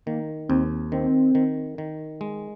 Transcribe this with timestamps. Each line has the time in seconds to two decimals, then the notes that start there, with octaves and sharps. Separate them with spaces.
0.06 D#3 A#3
0.49 D#2 C4
0.92 D#3 C4
1.35 D#3
1.78 D#3
2.21 G#3